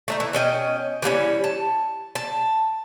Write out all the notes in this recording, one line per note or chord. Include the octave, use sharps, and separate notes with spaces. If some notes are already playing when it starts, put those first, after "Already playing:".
A3 D4 D#4
E3
B2 C#4 D#5 G5
E3 G3 A#3 C#4
A5
A5